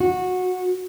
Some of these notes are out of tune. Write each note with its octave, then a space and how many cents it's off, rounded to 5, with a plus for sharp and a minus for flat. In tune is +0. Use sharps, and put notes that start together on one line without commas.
F#4 -15